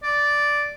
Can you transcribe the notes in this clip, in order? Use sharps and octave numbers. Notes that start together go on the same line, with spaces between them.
D5